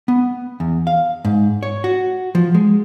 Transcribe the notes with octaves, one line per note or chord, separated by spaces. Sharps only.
B3
E2
F5
G#2
C#5
F#4
F3
G#3